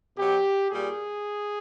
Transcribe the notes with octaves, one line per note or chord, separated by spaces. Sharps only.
B2 F#3 G4
A#2 G3 G#4